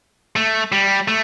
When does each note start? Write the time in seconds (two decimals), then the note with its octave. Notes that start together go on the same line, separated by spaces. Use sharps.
0.36 A3
0.72 G3
1.08 A3